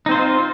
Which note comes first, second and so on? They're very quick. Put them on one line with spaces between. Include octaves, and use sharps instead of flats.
D#4 C4 C5 F4